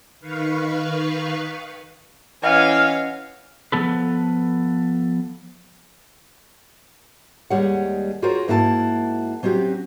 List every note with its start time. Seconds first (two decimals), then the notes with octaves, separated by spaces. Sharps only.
0.20 D#3 B4 F5 C#6
2.44 E3 C#4 D#5 F5 F#5 G#5 F6
3.72 F3 B3 A4 B4
7.50 D#2 G3 G#3 G#4 C#5 F#5
8.22 F4 F#4 G#4 A#4 C5 C#5
8.48 G#2 A#3 E4 F#4 C5 A5
9.43 F#3 C4 C#4 F#4 G4